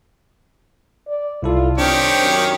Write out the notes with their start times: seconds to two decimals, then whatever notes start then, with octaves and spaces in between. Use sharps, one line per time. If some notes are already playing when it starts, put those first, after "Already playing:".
1.07 D5
1.43 C2 E4 F4 A4
1.78 D#3 C4 D4 G4 C#5
2.23 F#2